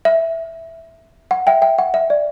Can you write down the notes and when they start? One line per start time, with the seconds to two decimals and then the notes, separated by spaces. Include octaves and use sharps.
0.05 E5
1.31 F#5
1.47 E5 G5
1.62 E5 G5
1.79 F#5
1.94 E5
2.10 D5